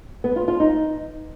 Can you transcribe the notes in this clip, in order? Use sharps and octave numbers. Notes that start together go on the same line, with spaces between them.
B3
F4
F4
D#4